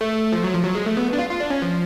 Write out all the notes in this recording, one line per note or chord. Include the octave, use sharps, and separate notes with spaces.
A3
F3
F#3
F3
F#3
G#3
A3
B3
D4
F4
F4
D4
C#4
F3